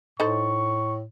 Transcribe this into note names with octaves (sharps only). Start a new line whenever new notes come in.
A2 D#4 A4 C5 C#6